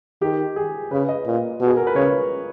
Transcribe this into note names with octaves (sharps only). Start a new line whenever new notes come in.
D#3 G4
G#4
C#3 B4
D#5
A#2
B2
G#4
A#4
B4
C#3 C#5